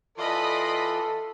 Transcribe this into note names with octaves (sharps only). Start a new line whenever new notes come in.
E3 F4 A4 D5 D#5 B5 C6